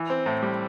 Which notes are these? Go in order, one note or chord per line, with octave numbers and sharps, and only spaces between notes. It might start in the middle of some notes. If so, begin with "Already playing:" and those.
Already playing: E3
C4
A2
G3